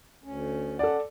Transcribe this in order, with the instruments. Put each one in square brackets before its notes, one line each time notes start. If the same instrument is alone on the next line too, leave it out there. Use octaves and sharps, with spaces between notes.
[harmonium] D2 C#4
[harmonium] C#4 F#5 [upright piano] A4 D5